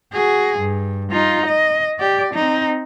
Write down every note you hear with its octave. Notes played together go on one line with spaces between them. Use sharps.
F#4 G#4
G2
D#4 F4
D#5
G4 D5
C4 D#4